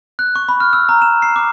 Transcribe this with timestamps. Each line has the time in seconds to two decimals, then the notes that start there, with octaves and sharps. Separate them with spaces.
0.19 F#6
0.36 C#6
0.49 B5
0.60 F6
0.73 E6
0.89 A#5
1.02 E7
1.22 C7
1.36 D6